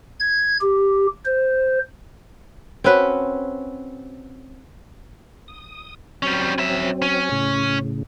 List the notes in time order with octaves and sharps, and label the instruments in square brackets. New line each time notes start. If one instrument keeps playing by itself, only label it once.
[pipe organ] G#6
G4
C5
[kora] C4 C#4 F#4 B4
[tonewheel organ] D#6
[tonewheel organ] F#3 C4 [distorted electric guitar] G3 C#4
[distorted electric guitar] C#4 E5
C#4
[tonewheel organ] A2 C#3